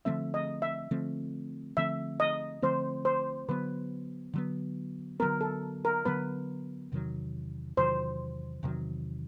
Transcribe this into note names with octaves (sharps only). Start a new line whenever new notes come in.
D3 F3 A3 C4 E5
D#5
E5
D3 F3 A3 C4
D3 F3 A3 C4 E5
D#5
D3 F3 A3 C4 C5
C5
D3 F#3 B3 B4
D3 F#3 B3
D3 F#3 B3 A#4
A4
A#4
D3 F#3 B3 B4
E2 C3 D#3 F#3
E2 C3 D#3 F#3 C5
E2 C3 D#3 F#3